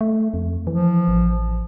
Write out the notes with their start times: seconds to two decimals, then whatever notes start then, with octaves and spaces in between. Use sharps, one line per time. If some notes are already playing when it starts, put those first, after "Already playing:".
0.01 A3
0.34 F2
0.67 E3 F3
1.08 A1